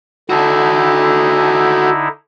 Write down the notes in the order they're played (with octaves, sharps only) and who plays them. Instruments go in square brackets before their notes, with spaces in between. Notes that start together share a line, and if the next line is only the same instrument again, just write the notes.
[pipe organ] D3 D#4 E4 [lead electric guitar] F#4 A4